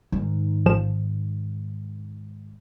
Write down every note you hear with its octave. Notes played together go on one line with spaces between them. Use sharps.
G#2 D#3
A1 F3 E7